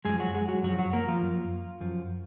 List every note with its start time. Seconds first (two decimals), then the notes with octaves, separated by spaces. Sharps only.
0.05 F#2 F3 G#3 G#4
0.20 F#3 F#4
0.34 G#3 G#4
0.48 F#3 F#4
0.63 F#2 F3 F#3 F#4
0.79 F#3 F#4
0.93 A#3 A#4
1.08 F3 F4
1.22 F#2 F3
1.81 F#2 F3